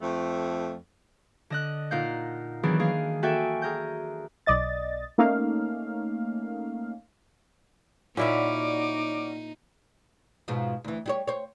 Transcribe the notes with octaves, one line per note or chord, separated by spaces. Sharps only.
F2 A3
D3 D#5 F#6
A#2 D#4 F5 F#5 G6
D#3 E3 F#3 B3 D4 G#4
A#3 G#4 F5
A#3 F#4 A4 E5 G5 G#5
G#4 A#4 G6
B1 D5 D#5 A6
A3 A#3 C#4 D#4 F5
A#2 C#4 D#4 E4 F#4 D5 E5 D6
G#2 B2 F3
D2 E3
G3 F#4 C#5
C5 C#5